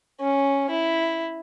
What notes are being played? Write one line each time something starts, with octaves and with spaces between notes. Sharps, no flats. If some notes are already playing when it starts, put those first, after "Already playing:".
C#4
E4